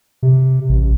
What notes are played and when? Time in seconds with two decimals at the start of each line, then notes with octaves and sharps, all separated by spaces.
0.23 C3
0.69 A1